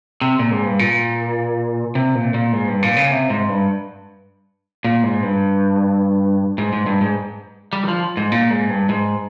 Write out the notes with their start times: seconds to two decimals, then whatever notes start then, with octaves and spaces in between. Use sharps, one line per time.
0.21 C3
0.39 A#2
0.51 G#2
0.66 G2
0.79 A#2
1.95 C3
2.15 A#2
2.34 A#2
2.53 G#2
2.68 G2
2.83 A#2
2.96 C#3
3.11 C3
3.30 G#2
3.49 G2
4.84 A#2
5.03 G#2
5.23 G2
6.58 G#2
6.73 G#2
6.86 G2
7.01 G#2
7.73 G3
7.83 D#3
7.88 F3
8.17 G#2
8.32 A#2
8.50 G#2
8.70 G2
8.89 G#2